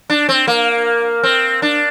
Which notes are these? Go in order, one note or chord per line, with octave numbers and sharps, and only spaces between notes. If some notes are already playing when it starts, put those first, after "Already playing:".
D4
C4
A#3
C4
D4